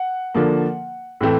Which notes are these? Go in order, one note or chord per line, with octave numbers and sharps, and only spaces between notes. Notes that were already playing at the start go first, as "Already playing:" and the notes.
Already playing: F#5
D3 F3 A#3
A2 E3 A3 C4